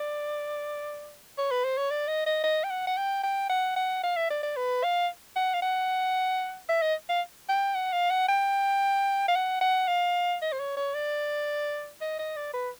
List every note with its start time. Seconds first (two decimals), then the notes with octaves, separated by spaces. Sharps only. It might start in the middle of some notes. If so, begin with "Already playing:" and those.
Already playing: D5
1.38 C#5
1.51 B4
1.64 C5
1.77 C#5
1.91 D5
2.08 D#5
2.26 D#5
2.44 D#5
2.64 G5
2.70 F#5
2.87 F#5
2.97 G5
3.23 G5
3.50 F#5
3.76 F#5
4.03 F5
4.16 E5
4.31 D5
4.43 D5
4.57 B4
4.84 F5
5.36 F#5
5.54 F5
5.62 F#5
6.69 E5
6.82 D#5
7.09 F5
7.49 G5
7.75 F#5
7.93 F5
8.11 F#5
8.29 G5
9.28 F5
9.36 F#5
9.61 F#5
9.88 F5
10.42 D#5
10.52 C5
10.60 C#5
10.77 C#5
10.95 D5
12.01 D#5
12.19 D#5
12.37 D5
12.54 B4